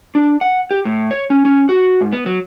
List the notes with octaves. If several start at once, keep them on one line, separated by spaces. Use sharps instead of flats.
D4
F#5
G4
A2
C#5
C#4
C#4
F#4
G#2
B3
F#3